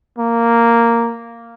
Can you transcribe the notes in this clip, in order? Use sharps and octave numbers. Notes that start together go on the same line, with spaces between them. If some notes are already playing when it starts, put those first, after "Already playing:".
A#3